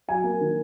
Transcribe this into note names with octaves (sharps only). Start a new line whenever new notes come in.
F#3 G#5
A#3
D#3